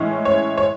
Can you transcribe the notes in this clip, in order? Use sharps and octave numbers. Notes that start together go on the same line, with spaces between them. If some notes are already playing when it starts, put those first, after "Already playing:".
Already playing: A2 E3 G#3 C#4 E4
C#5
C#5